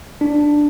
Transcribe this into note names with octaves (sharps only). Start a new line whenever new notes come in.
D4